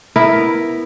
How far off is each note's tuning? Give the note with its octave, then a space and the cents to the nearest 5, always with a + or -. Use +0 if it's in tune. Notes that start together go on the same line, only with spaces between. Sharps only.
B3 -5 E4 +0 A#4 +0